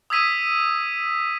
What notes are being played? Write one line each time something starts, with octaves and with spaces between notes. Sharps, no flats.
D#6 E6 G#6 B6 D#7